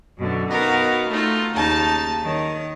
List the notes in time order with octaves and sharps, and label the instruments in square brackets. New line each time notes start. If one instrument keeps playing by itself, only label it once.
[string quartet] F#2 B2 D3
B3 D#4 F#4 A#4 F5
A3 D#4 F4
D#2 C#3 D#4 A5
D#3 C#5